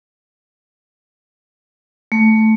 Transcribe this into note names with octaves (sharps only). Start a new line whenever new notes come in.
A3